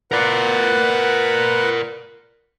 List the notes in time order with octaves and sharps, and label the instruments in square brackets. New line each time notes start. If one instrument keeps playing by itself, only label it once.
[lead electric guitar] A#4 D5 [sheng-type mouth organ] B4 F#5